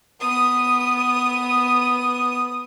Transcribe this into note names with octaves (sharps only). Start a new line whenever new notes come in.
B3 D#6